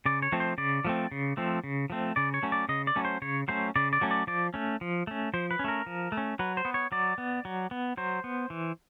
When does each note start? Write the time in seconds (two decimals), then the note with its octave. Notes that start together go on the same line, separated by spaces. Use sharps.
0.05 C#3 D5
0.22 C#5
0.32 F3 A3 C4
0.40 C5
0.58 C#3 D5
0.85 F3 A3 C4
1.12 C#3
1.37 F3 A3 C4
1.64 C#3
1.90 F3 A3 C4
2.16 C#3 D5
2.34 C#5
2.43 F#3 A3 C#4
2.52 D5
2.69 C#3 D#5
2.87 D5
2.96 F#3 A3 C#4
3.05 C5
3.22 C#3 C#5
3.48 F#3 A3 C#4 C5
3.76 C#3 D5
3.93 D5
4.01 F#3 A3 C#4
4.11 D5
4.27 F3 D5
4.54 A3 C#4
4.81 F3
5.07 A3 C#4
5.34 F3 C5
5.51 B4
5.59 C#4
5.64 A3 A#4
5.86 F3
6.12 A3
6.17 C#4
6.39 F#3 B4
6.57 C5
6.65 B3
6.74 C#5
6.92 F#3 D5
7.18 B3
7.45 F#3
7.71 B3
7.97 F#3 C5
8.24 B3
8.50 E3